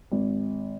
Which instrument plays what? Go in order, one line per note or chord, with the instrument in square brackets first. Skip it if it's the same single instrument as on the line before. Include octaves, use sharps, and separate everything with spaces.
[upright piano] G#1